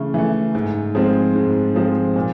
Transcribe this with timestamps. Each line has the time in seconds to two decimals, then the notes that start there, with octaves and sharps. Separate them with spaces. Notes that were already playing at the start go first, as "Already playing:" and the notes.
Already playing: C#3 E3 A3
0.14 E3 A3
0.55 G#2
0.95 F3 G#3 C4
1.35 G#2
1.75 F3 G#3 C4
2.16 A#2